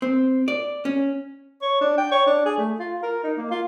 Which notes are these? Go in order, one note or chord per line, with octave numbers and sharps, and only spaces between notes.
C4
D5
C#4
C#5
D4
G5
C#5
D4
G#4
A3
F4
A#4
D#4
A#3
F4